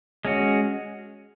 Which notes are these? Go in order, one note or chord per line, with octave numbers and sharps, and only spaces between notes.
G#3 C#4 F#4